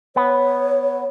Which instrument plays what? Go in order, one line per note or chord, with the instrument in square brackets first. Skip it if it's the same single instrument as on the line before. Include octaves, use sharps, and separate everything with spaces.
[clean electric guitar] B3 [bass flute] C#5